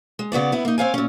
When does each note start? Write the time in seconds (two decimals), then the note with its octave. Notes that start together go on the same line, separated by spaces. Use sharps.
0.19 G#3
0.32 C#3 B3 F#4 D5
0.52 B3 E4
0.65 A#3 D#4
0.78 C4 C#5 F5 G#5
0.94 A#2 C#4